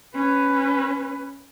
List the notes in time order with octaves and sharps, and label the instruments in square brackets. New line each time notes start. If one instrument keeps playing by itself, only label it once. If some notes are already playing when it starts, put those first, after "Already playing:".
[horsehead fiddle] C#4 B4